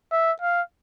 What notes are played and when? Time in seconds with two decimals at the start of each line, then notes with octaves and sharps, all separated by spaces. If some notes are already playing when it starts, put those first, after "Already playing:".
0.12 E5
0.41 F5